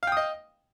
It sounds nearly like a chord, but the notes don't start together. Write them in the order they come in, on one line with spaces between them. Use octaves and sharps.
F5 G5 D#6 D#5